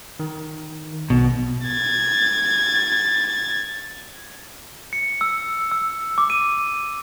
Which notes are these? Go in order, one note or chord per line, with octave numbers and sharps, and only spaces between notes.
D#3
B1 B2
G#6 A6
C#7
E6
E6
D6
D#7